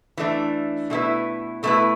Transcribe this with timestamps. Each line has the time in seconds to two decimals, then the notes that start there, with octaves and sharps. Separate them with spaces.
0.17 E3 A3 D4
0.90 B2 A3 E4 B4
1.63 B2 A3 E4 B4